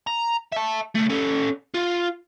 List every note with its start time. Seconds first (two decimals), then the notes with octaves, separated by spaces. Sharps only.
0.07 A#5
0.52 E5 A5
0.95 C#2 A3
1.10 C#4 A4
1.74 F4